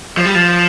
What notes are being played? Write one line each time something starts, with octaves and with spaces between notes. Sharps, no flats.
F3
G3
F3